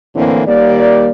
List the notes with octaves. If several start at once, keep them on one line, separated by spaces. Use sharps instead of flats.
A2 D3 E3 A#3 C4
D#2 G3 A#3 D5